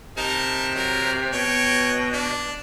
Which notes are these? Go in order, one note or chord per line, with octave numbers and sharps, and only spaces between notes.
C3 D#4 A#4 A5
F#3 A#4
B2 C#5 G5
D4